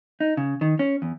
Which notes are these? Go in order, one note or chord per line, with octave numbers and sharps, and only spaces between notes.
D#4
C#3
D#3
C#4
E2